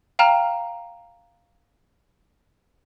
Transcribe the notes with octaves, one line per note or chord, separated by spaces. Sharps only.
F5 G5 A#5 F6 E7